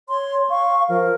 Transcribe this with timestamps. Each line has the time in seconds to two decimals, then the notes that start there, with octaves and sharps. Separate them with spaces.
0.09 C#5 C6
0.50 F5 C#6
0.89 F3 A#4